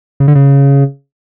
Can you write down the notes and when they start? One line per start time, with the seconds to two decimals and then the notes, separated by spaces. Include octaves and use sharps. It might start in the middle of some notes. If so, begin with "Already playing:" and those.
0.20 C#3
0.28 D3
0.35 C#3